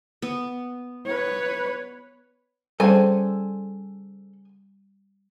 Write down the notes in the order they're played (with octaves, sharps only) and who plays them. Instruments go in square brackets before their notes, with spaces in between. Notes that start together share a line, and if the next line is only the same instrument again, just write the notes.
[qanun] B3
[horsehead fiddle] B4 C#5
[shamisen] C#3 C4 [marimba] G3 [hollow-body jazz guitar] A4 C5 D5 [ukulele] G#5